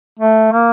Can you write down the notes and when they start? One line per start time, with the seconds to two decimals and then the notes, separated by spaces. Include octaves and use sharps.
0.19 A3
0.52 A#3